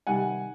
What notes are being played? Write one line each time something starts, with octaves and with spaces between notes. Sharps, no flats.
C3 D#3 G3 F#5 G#5